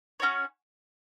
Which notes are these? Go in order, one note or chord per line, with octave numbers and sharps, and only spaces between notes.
C#4 F#4 C#5